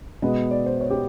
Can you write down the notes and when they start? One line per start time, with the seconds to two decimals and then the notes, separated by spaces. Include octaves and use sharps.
0.22 B2 G#3 B3 D#5
0.51 D5
0.66 C5
0.81 C#5
0.90 G4